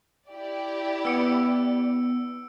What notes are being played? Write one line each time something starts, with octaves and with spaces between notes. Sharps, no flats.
E4 G4 D5
B3 E6 C#7 D7